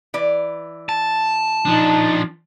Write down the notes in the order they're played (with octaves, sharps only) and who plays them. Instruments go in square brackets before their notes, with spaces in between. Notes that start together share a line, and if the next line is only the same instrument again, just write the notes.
[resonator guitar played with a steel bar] E3 D5
[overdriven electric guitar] A5
[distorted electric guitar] F3 D4 [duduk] D#4